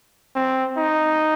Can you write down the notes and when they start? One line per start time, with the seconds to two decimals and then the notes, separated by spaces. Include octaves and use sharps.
0.36 C4
0.78 D#4